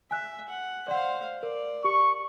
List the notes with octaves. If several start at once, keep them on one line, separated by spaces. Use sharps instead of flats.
E5 G#5 F#6
F#5
C5 D5 F5 F#5
A#4 D5
G4 C#6